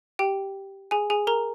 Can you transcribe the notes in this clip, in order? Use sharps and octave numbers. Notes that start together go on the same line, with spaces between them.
G4 G5
G#4 G#5
G#4 G#5
A#4 A#5